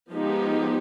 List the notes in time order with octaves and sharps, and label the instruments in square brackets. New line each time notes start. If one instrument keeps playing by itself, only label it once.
[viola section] F3 G#3 B3 D#4 G4